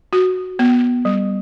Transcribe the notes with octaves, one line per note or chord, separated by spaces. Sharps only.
F#4
B3
G3